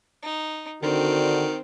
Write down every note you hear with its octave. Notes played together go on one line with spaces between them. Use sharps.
D#4
D3 D#3 C4 D4 F#4